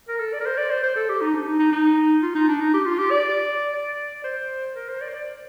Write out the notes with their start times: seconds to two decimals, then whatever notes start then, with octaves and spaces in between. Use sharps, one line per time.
0.09 A#4
0.19 A4
0.33 D5
0.40 A#4
0.46 C5
0.57 D5
0.70 C5
0.83 C5
0.96 A4
1.09 G4
1.21 D#4
1.34 D4
1.47 D#4
1.59 D#4
1.72 D#4
2.23 F4
2.35 D#4
2.48 D4
2.60 D#4
2.74 G4
2.86 F4
2.98 G4
3.11 D5
3.74 D5
4.24 C5
4.75 A#4
4.88 C5
5.01 D5
5.09 C5
5.14 D5